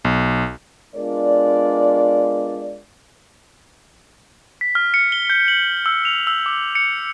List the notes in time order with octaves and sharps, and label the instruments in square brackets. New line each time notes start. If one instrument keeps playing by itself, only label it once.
[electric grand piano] B1
[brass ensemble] G#3 B3 D4 F4 A#4 D5
[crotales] B6
F6
C#7
G7
G6
F#7
E6
F7
E6
D6
C#7